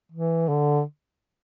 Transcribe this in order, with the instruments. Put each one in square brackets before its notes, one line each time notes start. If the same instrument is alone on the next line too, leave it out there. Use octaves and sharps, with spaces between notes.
[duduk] E3
D3